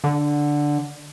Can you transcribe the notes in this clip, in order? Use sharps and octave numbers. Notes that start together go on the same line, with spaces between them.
D3